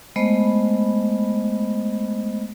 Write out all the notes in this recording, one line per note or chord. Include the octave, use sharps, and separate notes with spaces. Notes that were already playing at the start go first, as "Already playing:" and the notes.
G#3 A3 B3 C5 D#5 B5